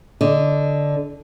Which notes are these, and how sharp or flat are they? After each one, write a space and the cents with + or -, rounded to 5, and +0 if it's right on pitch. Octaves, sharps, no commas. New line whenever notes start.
D3 -10 D#5 +0